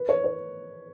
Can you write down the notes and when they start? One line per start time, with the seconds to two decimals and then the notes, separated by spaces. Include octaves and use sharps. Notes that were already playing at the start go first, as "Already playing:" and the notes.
Already playing: B4
0.09 C#5
0.24 C#5